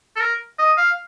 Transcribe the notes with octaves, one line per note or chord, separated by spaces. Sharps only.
A4
A#4
D#5
F5